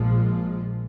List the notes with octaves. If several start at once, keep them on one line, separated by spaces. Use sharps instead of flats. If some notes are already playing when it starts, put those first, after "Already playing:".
Already playing: A#1 A#2 F3 G#3